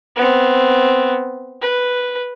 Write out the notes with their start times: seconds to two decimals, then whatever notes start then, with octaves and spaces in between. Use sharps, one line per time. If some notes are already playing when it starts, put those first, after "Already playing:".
0.16 B3 C4
1.61 B4